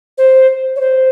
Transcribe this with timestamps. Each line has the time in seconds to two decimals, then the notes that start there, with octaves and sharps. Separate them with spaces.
0.18 C5
0.76 C#5
0.80 C5